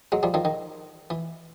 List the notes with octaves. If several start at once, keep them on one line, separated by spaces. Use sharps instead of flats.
F#3 G#3
F3 G3
D#3 F3
D#3
E3